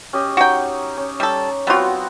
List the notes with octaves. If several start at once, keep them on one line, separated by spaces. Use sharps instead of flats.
C#4 G4 D#5
D#4 F#4 G5 C#6
C#4
G3 A4
G3 B3 C4 F4 F#4